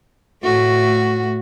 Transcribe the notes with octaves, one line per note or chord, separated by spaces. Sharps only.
A2 A3 F#4